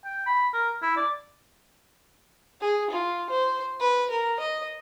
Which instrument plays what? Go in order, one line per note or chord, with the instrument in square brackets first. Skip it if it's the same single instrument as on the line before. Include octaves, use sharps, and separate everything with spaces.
[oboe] G5
B5
A#4
E4
D5
[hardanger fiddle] G#4
F4
C5
B4
A#4
D#5